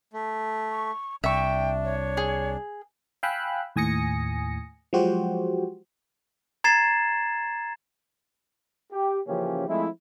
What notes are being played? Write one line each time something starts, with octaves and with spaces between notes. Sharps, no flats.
A3
C#6
C2 D4 E5 G5 C#6
C#5
G#4
F5 G5 G#5 B5 E6 F#6
D#2 A2 G#5 D#6 A#6 C#7
F3 F#3 G#3 F#4 G4 C5
A#5 G#6 A6 C7 E7
G4
C#3 E3 F3 A#3 C#4 G4
F3 G#3 A3 C4 E4